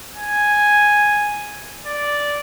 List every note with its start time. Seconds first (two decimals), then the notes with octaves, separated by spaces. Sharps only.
0.16 G#5
1.86 D5